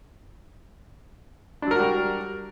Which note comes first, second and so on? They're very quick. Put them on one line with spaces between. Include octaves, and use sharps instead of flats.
D4 F#3 A#4 F#4 G3